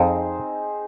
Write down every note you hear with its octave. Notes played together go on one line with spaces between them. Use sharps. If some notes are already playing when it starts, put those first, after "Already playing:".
Already playing: F2 C4 D#4 G#4 C5